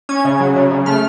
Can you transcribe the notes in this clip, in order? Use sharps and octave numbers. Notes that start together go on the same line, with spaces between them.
C#4 G#6
C#3
F#3
C#3
C#3
A3 F6